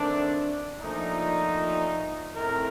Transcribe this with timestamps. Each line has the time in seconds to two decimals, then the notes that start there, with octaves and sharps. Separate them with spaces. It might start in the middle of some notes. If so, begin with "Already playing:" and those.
Already playing: D#3 A3 C4 D4
0.80 A#2 F3 A3 D4 D#4
2.35 A2 A3 C4 A#4